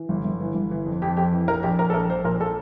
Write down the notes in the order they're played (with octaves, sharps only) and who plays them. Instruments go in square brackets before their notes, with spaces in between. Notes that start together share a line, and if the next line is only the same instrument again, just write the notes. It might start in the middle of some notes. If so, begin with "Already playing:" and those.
Already playing: [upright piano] E3
G1
G1
E3
G1
E3
F2
F2 G4
F2 G4
E3
A#1 A#4
A#1 G4
A#1 A#4
A4
A#1 A#4
A#1 C5
A#2 A#4
A#2 A4